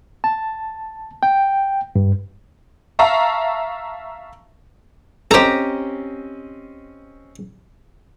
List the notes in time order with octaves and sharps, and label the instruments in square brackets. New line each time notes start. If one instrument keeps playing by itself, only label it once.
[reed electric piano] A5
G5
G2
[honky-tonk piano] E5 F5 A5 A#5 C#6
[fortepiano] C4 C#4 D#5 [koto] G4 A#5 [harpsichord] A4 C5